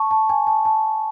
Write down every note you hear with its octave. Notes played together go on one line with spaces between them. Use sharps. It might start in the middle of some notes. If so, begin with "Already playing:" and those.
Already playing: A5 C#6
A5
G#5
A5
A5